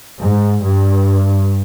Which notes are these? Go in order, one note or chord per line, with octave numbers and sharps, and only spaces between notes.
G#2
G2